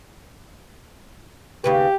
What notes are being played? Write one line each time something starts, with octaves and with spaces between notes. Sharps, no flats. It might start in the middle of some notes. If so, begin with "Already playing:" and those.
D#2 C#3 G4 B4